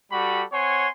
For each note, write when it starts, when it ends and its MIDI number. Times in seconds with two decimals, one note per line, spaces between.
0.12 0.44 55
0.12 0.44 66
0.12 0.44 67
0.12 0.44 69
0.12 0.44 83
0.53 0.88 60
0.53 0.88 73
0.53 0.88 78
0.53 0.88 80
0.53 0.88 84